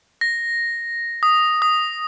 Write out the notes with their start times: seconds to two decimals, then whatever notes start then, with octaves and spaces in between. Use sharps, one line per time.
0.21 A#6
1.23 D#6
1.62 D#6